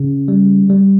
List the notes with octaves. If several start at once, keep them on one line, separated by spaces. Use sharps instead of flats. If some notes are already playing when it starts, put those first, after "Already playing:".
Already playing: C#3
G3
G3